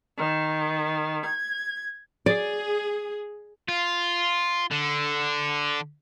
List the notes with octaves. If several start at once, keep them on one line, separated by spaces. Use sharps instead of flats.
D#3
G#6
G#4 D5
F4
D3